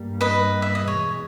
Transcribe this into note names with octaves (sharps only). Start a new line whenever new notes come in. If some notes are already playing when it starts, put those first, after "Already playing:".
Already playing: G2 G3 A#3
B4 D#5
E5
D#5
E2 B2 G#3 C#5